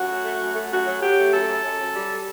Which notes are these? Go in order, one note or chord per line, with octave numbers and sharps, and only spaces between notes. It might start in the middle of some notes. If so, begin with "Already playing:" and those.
Already playing: F#2 F#4
A3
A3
F#2
A3
F#2 F#4
F#3
F#3 G4
A3
F#2 A4
F#2
F#2
F#2
G3